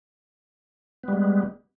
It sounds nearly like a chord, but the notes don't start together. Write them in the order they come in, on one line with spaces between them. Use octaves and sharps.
B3 G3 G#3